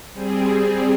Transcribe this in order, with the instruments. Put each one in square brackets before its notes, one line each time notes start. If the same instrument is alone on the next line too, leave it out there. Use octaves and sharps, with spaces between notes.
[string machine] G3 C4 G#4